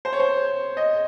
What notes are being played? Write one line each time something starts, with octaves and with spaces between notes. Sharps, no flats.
C5
C#5
C5
D#5